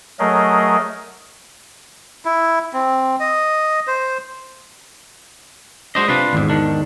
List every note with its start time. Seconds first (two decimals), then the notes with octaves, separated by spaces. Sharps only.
0.19 F#3 A3 G#4 A#4 D#5
2.25 E4
2.73 C4
3.20 D#5
3.87 C5
5.95 G#3 D4 F#4 C5 D#5
6.08 C3 D4 F4 B4
6.33 G#1 E2 G#2
6.49 D#3 D4